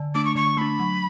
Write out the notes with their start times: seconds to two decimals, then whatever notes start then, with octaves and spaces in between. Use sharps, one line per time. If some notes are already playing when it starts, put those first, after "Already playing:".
Already playing: D3
0.15 A3 D4 D6
0.25 C#6
0.35 D3 C#6
0.57 A3 D4 B5
0.80 F#3